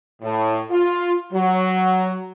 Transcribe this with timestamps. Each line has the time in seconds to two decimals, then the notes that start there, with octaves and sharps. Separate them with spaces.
0.22 A2
0.70 F4
1.32 F#3